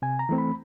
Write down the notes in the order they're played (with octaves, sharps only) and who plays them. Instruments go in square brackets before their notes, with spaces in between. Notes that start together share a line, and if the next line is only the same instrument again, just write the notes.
[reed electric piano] C3 G#5
A#5
E3 A3 C4
B5